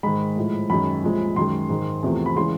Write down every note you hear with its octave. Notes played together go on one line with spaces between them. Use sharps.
G#2 D#3 G#3 B5
A2 F3 G#3
F#2 D#3 G#3 B5
C2 A#2 F3 G#3
F#2 D#3 G#3 C6
G#2 D#3 G#3
E2 C3 F3 A3
B5
C#3 E3 G#3 C6